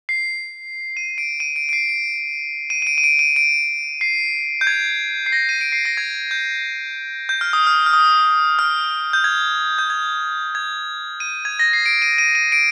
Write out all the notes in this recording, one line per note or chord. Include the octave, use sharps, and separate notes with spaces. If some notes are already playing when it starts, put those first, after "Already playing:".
C7
D#7
D7
D#7
D7
D7
C7
D7
D#7
D#7
D7
D#7
D7
D#7
D7
C7
G6
G#6
C7
A#6
D#7
D7
C7
A#6
G#6
G6
G6
F6
D#6
F6
F6
D#6
F6
G6
G#6
G6
G#6
G#6
D#7
G#6
A#6
C7
D7
D#7
D#7
D#7
D7